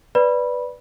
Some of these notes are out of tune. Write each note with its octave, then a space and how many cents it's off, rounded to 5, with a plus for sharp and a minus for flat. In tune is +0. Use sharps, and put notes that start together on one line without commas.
B4 +0 D5 +0 B5 -15